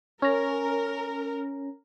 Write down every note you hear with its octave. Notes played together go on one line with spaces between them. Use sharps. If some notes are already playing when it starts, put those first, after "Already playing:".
C#4 A#4 A#5